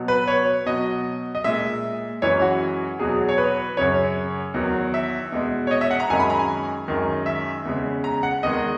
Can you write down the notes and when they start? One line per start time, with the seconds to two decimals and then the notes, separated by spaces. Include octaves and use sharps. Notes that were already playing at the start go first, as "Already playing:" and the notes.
Already playing: B2 F#3
0.08 B4
0.27 C#5
0.66 B2 F#3 D#5
1.35 D#5
1.44 A#2 G#3 E5
2.22 F#2 E3 G#3 C#5
2.42 F#4
2.99 E2 B2 F#3 G#4
3.29 C#5
3.38 B4
3.77 F#2 C#3 F#3 C#5
4.54 E2 D#3 F#3
4.94 E5
5.32 E2 B2 G#3
5.67 C#5
5.71 D#5
5.81 E5
5.91 F#5
6.00 A#5
6.10 F#2 D#3 G#3 G#5
6.20 B5
6.30 A#5
6.39 G#5
6.88 F#2 D#3 G#3
7.26 E5
7.65 E2 C#3 G#3
8.04 A#5
8.23 F#5
8.43 E2 D#3 G#3 D#5